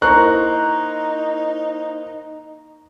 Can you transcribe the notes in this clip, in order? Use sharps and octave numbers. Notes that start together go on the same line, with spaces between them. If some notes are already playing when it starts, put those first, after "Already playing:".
A#3 D#4 E4 C5 A#5 C#6 F#6